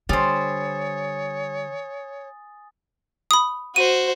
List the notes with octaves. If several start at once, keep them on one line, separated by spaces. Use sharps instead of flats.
D3 G3 C5 C#5 G#5 D#6 A6
B5 D#6
F#4 C5 D#7